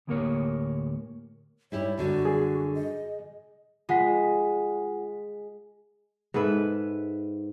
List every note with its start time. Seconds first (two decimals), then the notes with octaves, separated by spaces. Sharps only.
0.07 D2 A2 A#3 G4 A#4 C#5
1.72 G3 E4 G4 C#5
1.97 F#2 D3 G3 F#4
2.25 G#4
2.74 D#5
3.89 G#3 F4 F#5 B6
6.34 G#2 A4 B4 E5